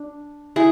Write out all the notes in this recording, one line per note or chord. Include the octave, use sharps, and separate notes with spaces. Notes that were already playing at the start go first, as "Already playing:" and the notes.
Already playing: D4
E4 G#4